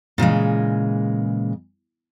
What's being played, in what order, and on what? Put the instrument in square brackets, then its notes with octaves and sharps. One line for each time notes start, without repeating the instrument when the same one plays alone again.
[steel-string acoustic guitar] A#2 C#3 E3 G#3